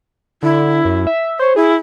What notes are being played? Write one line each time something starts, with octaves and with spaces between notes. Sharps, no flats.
D3 E4
F#2
E5
C5 C#5
E4 G#4